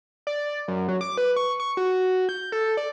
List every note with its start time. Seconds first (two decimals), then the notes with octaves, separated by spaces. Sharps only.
0.27 D5
0.68 F#2
0.88 F#3
1.01 D6
1.17 B4
1.36 C#6
1.60 C#6
1.77 F#4
2.29 G6
2.52 A4
2.77 D5